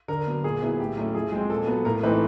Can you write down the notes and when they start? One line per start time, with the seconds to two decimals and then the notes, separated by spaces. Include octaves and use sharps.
0.08 D3 A#4
0.27 F#3 B3
0.44 A#2 G#4
0.62 F#3 B3 E4
0.79 A2 G4
0.97 F#3 A3 C#4 E4
1.14 F3 G#4
1.32 G#3 C4
1.50 A#2 A4
1.67 F#3 B3
1.85 A2 A#4
2.03 E3 A3 C4 D#4 B4